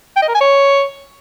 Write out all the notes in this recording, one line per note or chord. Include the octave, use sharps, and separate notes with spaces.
G5
D#5
A#4
G#5
C#5